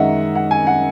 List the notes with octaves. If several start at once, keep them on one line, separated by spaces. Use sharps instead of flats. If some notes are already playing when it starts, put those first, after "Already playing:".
Already playing: F#2 D#3 G#3 D#5 E5 F#5
F#5
G#5
F#5